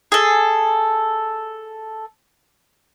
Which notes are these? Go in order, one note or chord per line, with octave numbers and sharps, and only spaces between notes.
G#4 A4